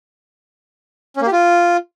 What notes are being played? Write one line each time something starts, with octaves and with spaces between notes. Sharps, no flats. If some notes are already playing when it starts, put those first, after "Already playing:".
C#4
A#3
G4
F4